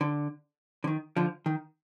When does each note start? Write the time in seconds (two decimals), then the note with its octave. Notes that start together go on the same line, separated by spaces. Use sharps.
0.01 D3
0.84 D3
0.87 D#3
1.16 D3 F3
1.46 D#3